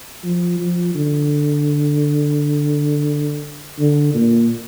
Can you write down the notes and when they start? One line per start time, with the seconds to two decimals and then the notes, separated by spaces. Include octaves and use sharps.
0.24 F3
0.59 F3
0.95 D3
3.79 D3
4.14 A#2